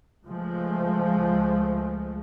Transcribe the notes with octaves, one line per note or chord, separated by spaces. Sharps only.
C#2 F3 G#3 A3